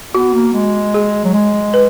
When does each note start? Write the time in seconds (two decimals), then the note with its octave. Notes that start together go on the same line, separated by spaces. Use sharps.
0.14 B3 F#4
0.34 A#3
0.54 G#3
0.94 G#4
1.24 F#3
1.34 G#3
1.74 B4